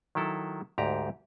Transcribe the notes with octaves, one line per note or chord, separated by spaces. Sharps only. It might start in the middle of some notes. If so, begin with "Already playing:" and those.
D#3 F#3 E4 A4
D2 G#2 G4 A#5